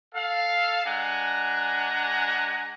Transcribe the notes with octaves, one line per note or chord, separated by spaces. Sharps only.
A4 F5
G#3 D4 F#5 G#5 A#5